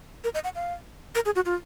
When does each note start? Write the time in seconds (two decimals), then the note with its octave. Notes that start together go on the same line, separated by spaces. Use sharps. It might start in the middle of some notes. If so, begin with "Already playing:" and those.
0.24 A#4
0.34 D#5
0.44 F#5
0.55 F5
1.15 A#4
1.25 G#4
1.36 F#4
1.46 F4